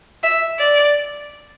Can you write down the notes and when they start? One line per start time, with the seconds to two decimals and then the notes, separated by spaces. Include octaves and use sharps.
0.23 E5
0.59 D5